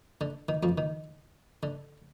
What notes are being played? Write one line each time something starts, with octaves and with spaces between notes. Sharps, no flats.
D3
D#3
F2 F3
D#3
D3